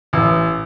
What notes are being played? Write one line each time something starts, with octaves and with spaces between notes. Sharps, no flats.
A1